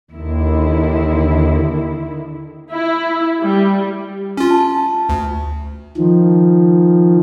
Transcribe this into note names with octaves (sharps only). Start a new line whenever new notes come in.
D#2 D3 D#3 E4
E4
G3
C#4 F4
A5
D2
D#3 F3